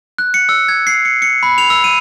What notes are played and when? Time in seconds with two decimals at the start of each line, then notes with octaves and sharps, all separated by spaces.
0.18 F#6
0.34 C#7
0.49 E6
0.69 G#6
0.87 C7
1.05 C#7
1.22 C#7
1.43 B5
1.58 F7
1.70 E6
1.84 D#7